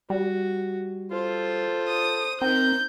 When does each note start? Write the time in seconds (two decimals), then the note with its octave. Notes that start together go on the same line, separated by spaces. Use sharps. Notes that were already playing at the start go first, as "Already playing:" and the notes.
0.10 G3 F#4
1.11 F4 A4 C5
1.89 D#6
2.42 D#3 C4 A#4 A#5 G6